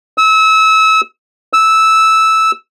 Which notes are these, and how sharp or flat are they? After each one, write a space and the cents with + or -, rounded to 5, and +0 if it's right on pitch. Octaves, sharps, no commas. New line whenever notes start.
E6 -30
E6 -10